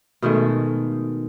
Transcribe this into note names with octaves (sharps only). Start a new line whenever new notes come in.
B2 D#3 G#3 A3